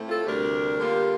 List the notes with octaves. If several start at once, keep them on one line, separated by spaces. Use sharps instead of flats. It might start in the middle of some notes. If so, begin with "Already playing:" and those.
Already playing: A2 A3 C4
F4 A4
D2 C3 G3 D4 G4 A#4
D3 G3 A#3 F4